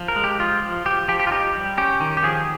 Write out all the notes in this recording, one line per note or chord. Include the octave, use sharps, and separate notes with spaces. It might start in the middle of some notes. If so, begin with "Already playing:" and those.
Already playing: F3
A#4
G#3
G4
F3 F4
F3
F3 G4
F3 G4
G4
F4
D#4 G4
G3
C#4 G4
D#3
G4
F3 G#4